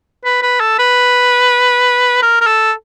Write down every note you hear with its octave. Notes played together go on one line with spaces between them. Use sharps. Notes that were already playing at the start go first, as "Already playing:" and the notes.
B4
B4
A4
B4
A#4
A#4
A4